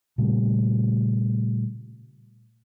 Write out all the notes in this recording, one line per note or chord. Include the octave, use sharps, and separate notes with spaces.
A#2 C#3 G3 A3